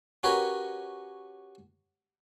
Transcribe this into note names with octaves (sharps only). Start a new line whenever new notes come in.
C#4 F#4 G4 A#4 B4 C#5